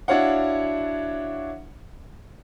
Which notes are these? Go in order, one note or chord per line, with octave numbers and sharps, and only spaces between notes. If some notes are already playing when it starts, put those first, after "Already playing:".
D4 E4 F#4 C#5 F5 F#5